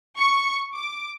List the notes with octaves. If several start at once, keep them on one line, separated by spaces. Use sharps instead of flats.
C#6
D6